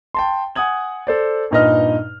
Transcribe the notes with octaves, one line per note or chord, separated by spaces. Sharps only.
G5 A5 C6
F#5 G#5 D#6 G#6 F#7
A4 C5 D5
G2 A#2 D#4 B4 D#5 F6